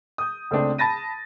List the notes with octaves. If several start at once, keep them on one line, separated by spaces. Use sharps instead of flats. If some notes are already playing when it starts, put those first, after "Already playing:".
D#6 G6
C#2 A3 C4 D4
A5 B5 A6 A#6 D#7